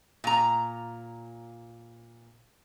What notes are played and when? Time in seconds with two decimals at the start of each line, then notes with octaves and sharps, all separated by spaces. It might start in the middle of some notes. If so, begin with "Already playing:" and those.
0.24 A#2 A#5